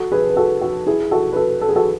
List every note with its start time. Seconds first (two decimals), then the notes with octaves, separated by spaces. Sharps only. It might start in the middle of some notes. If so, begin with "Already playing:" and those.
Already playing: F#4 A4
0.12 G#4 B4
0.30 B4
0.36 F#4 A4
0.62 F#4
0.86 E4 G#4
1.11 F#4 A4
1.32 B4
1.36 F#4 A4
1.61 A4
1.69 G#4
1.76 F#4 A4